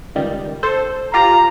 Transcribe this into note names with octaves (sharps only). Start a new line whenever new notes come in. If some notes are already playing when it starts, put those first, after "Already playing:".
C#2 D#3 G3
A4 C5
F4 G4 F5 A#5